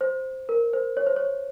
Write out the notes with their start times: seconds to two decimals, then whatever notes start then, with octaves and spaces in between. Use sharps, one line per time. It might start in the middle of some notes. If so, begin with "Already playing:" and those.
0.01 C5
0.49 A#4
0.73 C5
0.97 C#5
1.07 C5
1.16 C#5